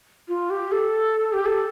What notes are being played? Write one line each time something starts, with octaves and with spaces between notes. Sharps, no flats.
F4
G4
A4
G4
A4